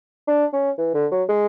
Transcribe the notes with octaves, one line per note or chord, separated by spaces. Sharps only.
D4
C#4
E3
D3
F#3
G#3